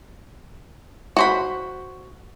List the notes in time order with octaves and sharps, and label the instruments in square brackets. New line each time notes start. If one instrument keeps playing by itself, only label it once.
[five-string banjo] F#4 C5 B5